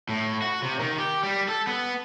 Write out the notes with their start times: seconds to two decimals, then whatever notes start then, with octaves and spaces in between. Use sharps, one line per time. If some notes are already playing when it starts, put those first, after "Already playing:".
0.09 A2
0.42 F#4
0.62 C3
0.79 D#3
0.98 G4
1.23 G3
1.49 A4
1.67 B3